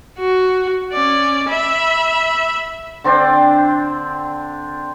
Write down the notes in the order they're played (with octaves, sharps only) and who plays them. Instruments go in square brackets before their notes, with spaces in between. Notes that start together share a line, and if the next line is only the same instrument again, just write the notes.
[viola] F#4
C#4 D5
E5 B5
[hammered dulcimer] D3 C4 D4 G5